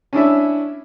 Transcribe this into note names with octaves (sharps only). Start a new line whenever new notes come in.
C#4 D4 E4 E5